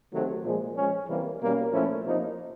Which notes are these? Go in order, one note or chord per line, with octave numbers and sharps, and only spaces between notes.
C3 D#3 F#3 A3
A#2 F3 G#3
F3 G#3 C#4
C3 E3 G3 A#3
B2 G3 A#3 C#4
A#2 F3 A3 C#4 E4
C3 F3 A#3 D#4